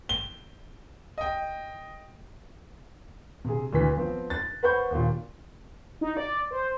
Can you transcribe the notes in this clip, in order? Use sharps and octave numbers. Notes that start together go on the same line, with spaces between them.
G7
D#5 G5
C3 G#4
D2 E3 B6
F3 B3 C4
F#6 A6
B4 C5 F#5 B5 C#6 G6
D#2 A#2
D#4
D5
C5